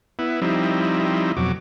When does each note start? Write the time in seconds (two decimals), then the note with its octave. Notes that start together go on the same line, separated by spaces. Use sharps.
0.19 B3 E4
0.42 F3 G3 C4 D#4 E4
1.37 F2 B2 F#3 D6